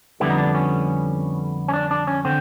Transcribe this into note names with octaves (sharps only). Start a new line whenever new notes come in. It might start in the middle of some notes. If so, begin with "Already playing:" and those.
F2 D3 G3 B3 E4
D#4
D4
C#4
C#4
D4
D4
C#4
D3 C4